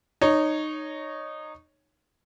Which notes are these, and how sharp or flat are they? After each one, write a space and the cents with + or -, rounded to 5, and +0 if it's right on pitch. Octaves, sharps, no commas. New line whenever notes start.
D#4 -15 C#5 +0